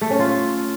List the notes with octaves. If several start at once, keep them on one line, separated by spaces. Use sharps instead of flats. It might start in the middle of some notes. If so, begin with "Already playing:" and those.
A3
C#4
F4